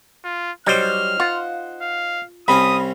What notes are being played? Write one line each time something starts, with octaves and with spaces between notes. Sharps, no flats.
F4
F#3 G3 D#4 C5 F6
F4 F#5
F5
C2 C4 C#4 B5 D#6